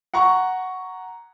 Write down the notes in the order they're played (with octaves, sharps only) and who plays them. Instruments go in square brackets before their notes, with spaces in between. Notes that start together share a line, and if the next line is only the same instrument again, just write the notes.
[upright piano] F#5 A#5 C#6